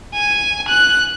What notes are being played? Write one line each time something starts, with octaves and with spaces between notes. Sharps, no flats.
G#5
F#6